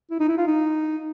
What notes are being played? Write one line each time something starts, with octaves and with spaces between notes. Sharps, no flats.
E4
D#4
E4
F4
D#4